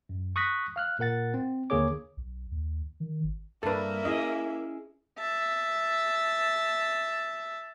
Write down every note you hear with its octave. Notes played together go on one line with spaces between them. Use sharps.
F#2
C#6 D#6 F#6 A#6 B6
F5 F6 F#6
A#2 A#4 F#5 A6
C4
D#2 D3 A#3 G#4 C#5 D6
B1
D#2
D#3
G#1
G2 A#3 D4 A4 B4 E5
C#4 E4 G#4 D#5
E5 A5